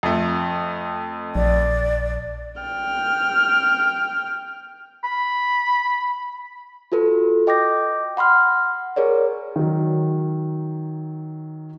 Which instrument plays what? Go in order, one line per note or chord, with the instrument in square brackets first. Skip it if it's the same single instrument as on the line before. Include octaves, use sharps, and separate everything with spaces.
[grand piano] F2 A3
[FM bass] A#1 [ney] D5
[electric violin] G5 F6
[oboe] B5
[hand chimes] F4 F#4 A4 B4
D#5 G5 D6 G6 A#6
F#5 B5 C6 F6
G#4 A#4 C#5 D5
[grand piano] D#3 F#3